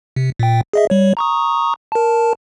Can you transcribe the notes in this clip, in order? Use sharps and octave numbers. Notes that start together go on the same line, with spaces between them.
C3
A#2 G5
G#4 D#5 E5
G3 C#5
A#5 C#6 D#6
A#4 A5